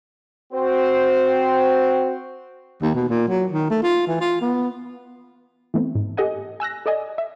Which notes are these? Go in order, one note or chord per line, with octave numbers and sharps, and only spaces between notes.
C4 F#4 C5
D#2
B2
A#2
F#3
D#3
A3
F4
E3
F4
B3
E3 A3 B3 C4
G#2
G4 A4 D#5 F#5 G#5
G#5 E6 F#6 A#6
A4 D5 D#5 G#5
E5